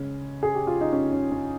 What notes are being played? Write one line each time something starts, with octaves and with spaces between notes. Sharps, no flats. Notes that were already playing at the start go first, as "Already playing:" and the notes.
Already playing: C#3 G#3 C#4
G#4
G4
F4
D#4
C#4
C#4
C#4